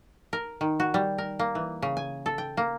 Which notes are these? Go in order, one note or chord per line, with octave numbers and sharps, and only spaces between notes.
A#4
D#3
F#4
G3
A#4
A#3
E3
C#3
G#5
A4
G5
A#3